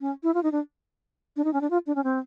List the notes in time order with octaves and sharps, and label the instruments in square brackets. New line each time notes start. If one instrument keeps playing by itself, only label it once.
[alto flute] C#4
E4
F4
D#4
D4
D4
D#4
C#4
D4
F4
D4
C#4
C4